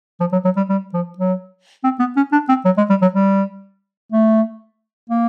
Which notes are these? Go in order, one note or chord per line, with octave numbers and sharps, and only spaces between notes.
F3
F#3
F#3
G3
G3
F3
F#3
C4
B3
C#4
D4
C4
F#3
G#3
G3
F#3
G3
A3
A#3